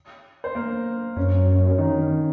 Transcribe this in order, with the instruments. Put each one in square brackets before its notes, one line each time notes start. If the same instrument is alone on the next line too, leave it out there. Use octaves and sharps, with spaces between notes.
[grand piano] C5
A#3 A#4
[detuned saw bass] F#2 [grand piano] C#4
[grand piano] C#4
D#3 D#4
C#4